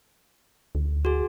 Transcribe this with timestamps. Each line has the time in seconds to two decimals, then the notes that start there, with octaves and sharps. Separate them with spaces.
0.75 D2
1.05 F#4 G#4